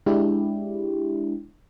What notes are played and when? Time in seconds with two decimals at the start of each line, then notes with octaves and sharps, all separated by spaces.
0.06 G#3 D4 E4 G4